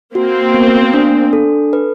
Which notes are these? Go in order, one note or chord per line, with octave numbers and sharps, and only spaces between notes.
A#3 C4 F#4
B3
D4
A4
B4